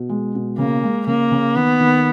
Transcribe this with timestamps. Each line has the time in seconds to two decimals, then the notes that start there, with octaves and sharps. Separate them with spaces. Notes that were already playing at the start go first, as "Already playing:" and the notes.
Already playing: B2
0.09 G#3
0.35 B2
0.58 C#3 A#3
0.83 G#3
1.07 C#3 A#3
1.31 C#3
1.55 D#3 B3
1.80 D#3